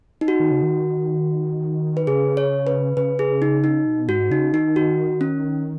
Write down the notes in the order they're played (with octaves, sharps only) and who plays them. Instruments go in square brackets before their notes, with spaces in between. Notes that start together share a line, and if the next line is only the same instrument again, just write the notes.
[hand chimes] D#4
F#4
[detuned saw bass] D#3
C#3
D#3
[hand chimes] B4
[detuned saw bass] C#3 [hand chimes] G#4
[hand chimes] C#5
B4
[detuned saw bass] C#3 [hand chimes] B4
[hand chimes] G#4
D#4
D#4
[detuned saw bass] B2
[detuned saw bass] G#2 [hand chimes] F#4
[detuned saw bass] C#3 [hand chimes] D#4
[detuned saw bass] D#3 [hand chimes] D#4
[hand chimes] F#4
C#4